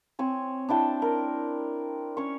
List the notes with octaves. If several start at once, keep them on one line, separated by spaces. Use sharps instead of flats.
C4 C#5 G#5
D4 E4 G5 A5
A#4
C#4 C#5 C#6